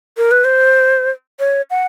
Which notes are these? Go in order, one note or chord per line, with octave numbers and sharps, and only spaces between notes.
A#4
B4
C5
C#5
F#5